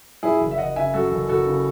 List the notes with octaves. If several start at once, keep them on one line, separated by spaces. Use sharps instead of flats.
F#2 E4 G#4
F#1
E5
F#1 D#5 F#5
C#3 E5 G#5
F#2 F#4 A4
F#1
F#1 F#4 A4
C#3